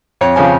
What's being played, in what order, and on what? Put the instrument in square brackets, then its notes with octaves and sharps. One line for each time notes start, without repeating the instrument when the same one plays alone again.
[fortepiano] F2 C#5
C#3 F3 G#5